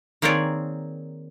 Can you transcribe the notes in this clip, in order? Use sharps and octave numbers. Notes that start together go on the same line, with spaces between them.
D#3 A#3 C4 G#4 C#5 D5